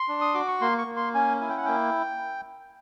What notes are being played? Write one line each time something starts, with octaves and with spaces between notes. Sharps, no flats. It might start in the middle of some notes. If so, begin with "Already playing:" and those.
Already playing: C6
D4
D#6
F#4 D6
C#6
A#3 C6
C#6
A#3
C6
C#4 G#5
E4 G#5
G5
F#5
A#3 G5